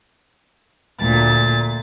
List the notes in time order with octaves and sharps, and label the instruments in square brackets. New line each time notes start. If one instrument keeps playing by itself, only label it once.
[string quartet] D2 A#2 A6